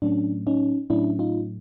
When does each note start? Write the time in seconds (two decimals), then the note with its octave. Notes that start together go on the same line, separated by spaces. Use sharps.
0.02 A2 F#3 A3 C#4 D4
0.47 C#4 D#4
0.90 A2 F#3 A3 C#4 D4 E4
1.19 D#4 F4